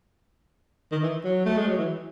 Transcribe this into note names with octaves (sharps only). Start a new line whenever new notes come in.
D#3
E3
F#3
A3
G#3
F#3
E3